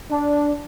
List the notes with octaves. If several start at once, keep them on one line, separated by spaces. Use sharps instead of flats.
D4